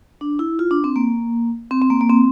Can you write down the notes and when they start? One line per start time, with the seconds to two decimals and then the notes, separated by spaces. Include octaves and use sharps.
0.21 D4
0.39 E4
0.59 F4
0.71 D4
0.84 C4
0.96 A#3
1.71 C4
1.82 C4
1.90 A#3
2.01 A#3
2.10 C4